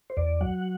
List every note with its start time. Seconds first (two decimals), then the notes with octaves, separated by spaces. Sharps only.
0.10 C5
0.17 E2 D5
0.41 F#3 F#5